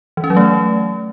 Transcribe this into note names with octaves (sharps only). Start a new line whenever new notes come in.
E3
C#4
F#3
A3